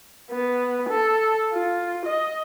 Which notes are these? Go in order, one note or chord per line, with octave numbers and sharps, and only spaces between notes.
B3
A4
F4
D#5